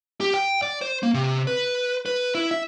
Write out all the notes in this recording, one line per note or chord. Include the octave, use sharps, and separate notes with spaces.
G4
G5
D5
C5
A#3
C3
B4
B4
E4
E5